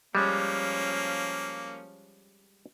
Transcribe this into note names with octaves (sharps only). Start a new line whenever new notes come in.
F3 G3 G#3 A#3 C#4